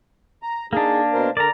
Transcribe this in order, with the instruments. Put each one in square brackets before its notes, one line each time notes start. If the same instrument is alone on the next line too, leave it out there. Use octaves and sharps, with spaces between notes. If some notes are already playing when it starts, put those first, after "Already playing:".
[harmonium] A#5
[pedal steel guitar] A#3 D4 [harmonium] D#4 G#4
[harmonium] B2 A#4 C5
[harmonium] D3 A#4 [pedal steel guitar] D5 A#5